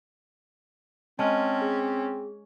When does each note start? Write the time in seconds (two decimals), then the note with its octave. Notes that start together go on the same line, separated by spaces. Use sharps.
1.19 G#3 C4 C#4 A5 F6
1.62 G#4